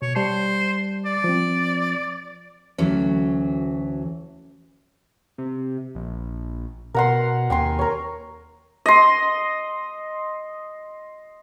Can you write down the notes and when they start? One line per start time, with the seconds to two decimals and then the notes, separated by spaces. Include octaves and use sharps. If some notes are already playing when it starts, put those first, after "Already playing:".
0.02 B2 C#5
0.15 G3 C5 A5 C7
1.05 D5
1.24 F3 C4
2.78 D2 E3 F#3 C#4
5.38 C3
5.95 A#1
6.94 B2 A#4 F#5 C6
7.50 D#2 G5 G#5 C6
7.79 A#4 C#5
8.86 D#5 C6